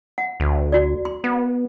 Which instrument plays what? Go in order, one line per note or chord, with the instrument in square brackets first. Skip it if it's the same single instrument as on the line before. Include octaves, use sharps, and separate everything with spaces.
[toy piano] F#5
[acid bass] D2
[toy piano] F#4 D5
C6
[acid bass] B3